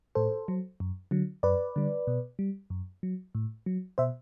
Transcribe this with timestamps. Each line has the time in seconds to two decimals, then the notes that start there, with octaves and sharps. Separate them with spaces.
0.15 A2 A4 C5
0.48 F#3
0.80 F#2
1.11 D3 F#3
1.43 F#2 B4 D5
1.76 D3 G3
2.07 B2
2.39 G3
2.70 F#2
3.03 F#3
3.35 A2
3.66 F#3
3.98 B2 C5 E5